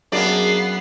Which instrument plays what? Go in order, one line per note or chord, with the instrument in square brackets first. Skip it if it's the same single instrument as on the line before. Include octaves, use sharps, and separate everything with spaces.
[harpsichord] F#2 [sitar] A#3 D4 D5 [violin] B3 C7 [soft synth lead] G#4